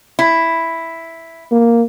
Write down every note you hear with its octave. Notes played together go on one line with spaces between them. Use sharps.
E4
A#3